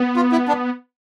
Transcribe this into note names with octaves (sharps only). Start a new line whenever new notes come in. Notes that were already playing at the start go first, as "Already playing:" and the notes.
Already playing: B3
F4
E4
D4